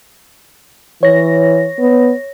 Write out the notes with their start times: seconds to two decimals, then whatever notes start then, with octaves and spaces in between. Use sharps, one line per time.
1.03 E3 C#5 A#6
1.79 B3